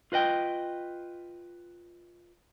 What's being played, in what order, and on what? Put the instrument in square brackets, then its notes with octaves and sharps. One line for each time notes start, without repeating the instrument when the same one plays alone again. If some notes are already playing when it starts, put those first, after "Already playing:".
[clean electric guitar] F4 B4 D#5 G5